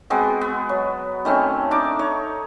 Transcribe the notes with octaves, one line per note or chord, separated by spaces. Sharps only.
G#3 B3 C4 F#4
B3
F#3
D#3 A3 C4 C#4
D4 D#4 D6
D#4 C#5